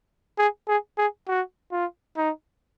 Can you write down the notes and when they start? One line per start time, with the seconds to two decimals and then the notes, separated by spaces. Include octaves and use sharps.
0.38 G#4
0.68 G#4
0.98 G#4
1.28 F#4
1.72 F4
2.17 D#4